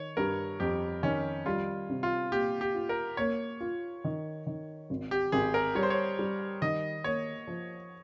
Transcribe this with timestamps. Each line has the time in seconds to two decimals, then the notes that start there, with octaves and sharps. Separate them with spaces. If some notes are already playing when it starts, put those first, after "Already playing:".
Already playing: D#3 C#5
0.17 G2 A#4
0.60 F2 G4
1.03 D#3 C#4
1.46 G3 F4
1.89 C3
2.03 F4
2.32 A#2 G4
2.61 G4
2.75 F4
2.89 A#4
3.17 A#3 C#5
3.61 F4
4.04 D#3
4.47 D#3
4.90 G#1
5.11 G4
5.32 G#1 G#4
5.54 A#4
5.75 G3 C#5
5.83 C5
5.90 C#5
6.19 G3
6.62 D#3 D#5
7.04 A#3 C#5
7.47 F3